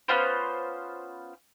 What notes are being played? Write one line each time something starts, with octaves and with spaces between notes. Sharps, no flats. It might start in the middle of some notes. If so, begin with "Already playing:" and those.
B3 C#4 F4 C5